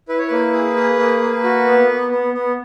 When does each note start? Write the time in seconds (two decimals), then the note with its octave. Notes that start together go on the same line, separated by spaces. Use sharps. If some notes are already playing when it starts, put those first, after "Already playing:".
0.09 E4 B4
0.19 C#5
0.28 A#3 B4
0.54 G#4
0.76 G#4
0.99 A#3
1.21 A#3
1.44 F#4
1.66 B3
1.89 B3
2.11 B3
2.34 B3